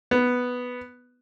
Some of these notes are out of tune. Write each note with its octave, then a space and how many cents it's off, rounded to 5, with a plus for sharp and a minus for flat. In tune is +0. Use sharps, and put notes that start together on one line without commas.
B3 +0